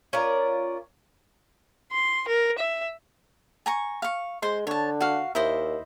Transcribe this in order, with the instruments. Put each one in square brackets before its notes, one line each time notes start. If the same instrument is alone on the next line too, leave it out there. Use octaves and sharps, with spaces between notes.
[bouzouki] C#4 F4 A#4 D5
[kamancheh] C6
A#4
E5
[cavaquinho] G#5 A#5 C#6
F5 C#6
[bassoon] G#3 [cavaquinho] C5 C6
[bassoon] D3 [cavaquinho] C#5 A5
[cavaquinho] F#4 F5
[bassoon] D#2 [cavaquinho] E4 C5 D#5